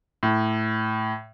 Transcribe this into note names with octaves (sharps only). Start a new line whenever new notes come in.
A2